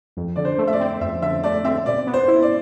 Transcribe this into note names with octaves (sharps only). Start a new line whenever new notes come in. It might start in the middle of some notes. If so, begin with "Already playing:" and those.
F2
D3 D5
C5
A3
E5
D5
C4
F2 E5
D3 E5
A3 D5
C4 E5
B2 D5
B3
C5
E4
D5